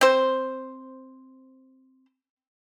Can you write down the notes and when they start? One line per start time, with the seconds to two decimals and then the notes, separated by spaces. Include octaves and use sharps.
0.01 C4 C5